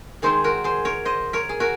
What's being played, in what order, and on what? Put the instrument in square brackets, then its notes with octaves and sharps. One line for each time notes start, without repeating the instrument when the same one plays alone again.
[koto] D#3 G#3 C4 D#4 G#4 C5
F#4 A#4
G#4 C5
A#4 C#5
C5 D#5
A#4 C#5
G#4
F#4 A#4